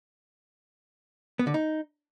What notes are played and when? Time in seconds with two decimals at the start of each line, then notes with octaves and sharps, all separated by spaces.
1.39 B3
1.47 D3
1.54 D#4